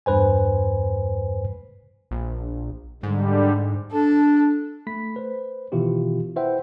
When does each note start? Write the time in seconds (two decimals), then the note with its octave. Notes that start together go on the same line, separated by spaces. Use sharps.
0.06 E2 G2 B4 C5 G#5
2.11 A#1
3.03 G#2 D3 G3
3.92 D4 A4
4.87 A3 B5 B6
5.16 B4 C5
5.72 B2 D#3 E3 E4 F4 G4
6.36 E4 B4 C5 E5 F#5 G5